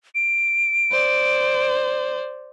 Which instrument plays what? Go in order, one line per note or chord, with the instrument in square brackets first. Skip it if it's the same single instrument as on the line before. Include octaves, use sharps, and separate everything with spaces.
[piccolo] D7
[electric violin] C5 D5